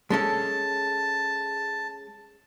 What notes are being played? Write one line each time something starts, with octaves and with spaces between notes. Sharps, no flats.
G#3 C#4 A4 A5